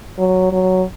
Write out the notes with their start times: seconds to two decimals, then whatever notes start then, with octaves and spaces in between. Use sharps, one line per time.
0.18 F#3
0.52 F#3